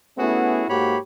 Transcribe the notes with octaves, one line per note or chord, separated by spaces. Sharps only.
A3 B3 C#4 E4 F#4 G#4
G#2 A#3 F#4 G4 C#5 B5